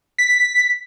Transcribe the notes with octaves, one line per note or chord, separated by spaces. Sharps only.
B6